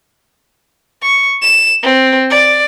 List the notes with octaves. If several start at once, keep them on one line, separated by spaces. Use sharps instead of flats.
C#6
E7
C4
D5